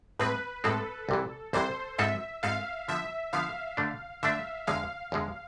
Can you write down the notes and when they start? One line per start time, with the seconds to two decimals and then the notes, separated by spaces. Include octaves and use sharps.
0.19 A2 G#3 C4 B4
0.64 A2 G#3 C4 A4
1.09 C2 C3 E3
1.53 C2 C3 E3 C5
1.98 G#2 G#3 C4 F4 A4 E5
2.43 G#2 G#3 C4 F4 A4 F5
2.88 D3 F3 B3 E5
3.33 D3 F3 B3 F5
3.77 D3 A3 D4
4.23 D3 A3 D4 E5
4.67 E2 D3 G#3 F5
5.12 E2 D3 G#3